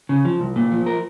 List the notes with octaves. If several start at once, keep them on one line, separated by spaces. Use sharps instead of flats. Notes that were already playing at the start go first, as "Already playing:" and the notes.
C#3
F3
C2
A#2
F3
A#4